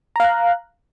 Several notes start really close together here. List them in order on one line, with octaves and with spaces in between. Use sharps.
A#5 F5 F#6